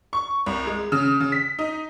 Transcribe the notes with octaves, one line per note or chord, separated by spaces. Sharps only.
C#6
C2
G#3
C#3
C#3
B6
D#4